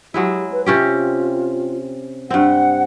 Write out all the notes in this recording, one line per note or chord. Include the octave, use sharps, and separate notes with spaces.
F#3 G#3 E4 G4
B4
C3 C#4 F4 G4
G2 C4 F#5